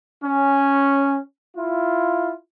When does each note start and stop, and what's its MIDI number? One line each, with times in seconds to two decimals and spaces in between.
0.24 1.18 61
1.57 2.34 64
1.57 2.34 65